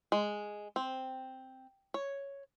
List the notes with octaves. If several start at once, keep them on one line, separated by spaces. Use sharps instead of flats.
G#3
C4
C#5